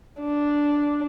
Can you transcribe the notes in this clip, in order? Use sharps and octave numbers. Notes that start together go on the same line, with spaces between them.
D4